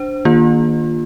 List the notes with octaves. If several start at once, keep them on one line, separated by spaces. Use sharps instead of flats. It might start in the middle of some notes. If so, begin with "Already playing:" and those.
Already playing: D4 C5
D#3 A#3 F4